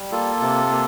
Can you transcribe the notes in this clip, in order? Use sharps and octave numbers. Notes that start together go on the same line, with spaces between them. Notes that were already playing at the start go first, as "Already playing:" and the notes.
Already playing: G3
A#3 F4 A4
C3
A#3